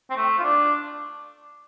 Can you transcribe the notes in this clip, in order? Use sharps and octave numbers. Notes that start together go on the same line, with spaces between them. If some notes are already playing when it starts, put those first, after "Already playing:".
C4
A3
F4
D4